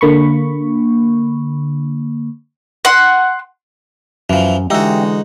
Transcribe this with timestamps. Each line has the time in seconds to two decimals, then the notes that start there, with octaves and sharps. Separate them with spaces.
0.01 D3 A#3 B5 C#6
2.85 F#5 C6
4.30 F#2 E3 F3
4.70 D3 E3 G#3 D#4 F#4 G4 E5